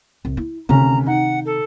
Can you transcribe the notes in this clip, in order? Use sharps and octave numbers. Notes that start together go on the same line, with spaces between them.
C2
E4
D2 C3 D#3 C#4 A#5
D#4 F#5
A4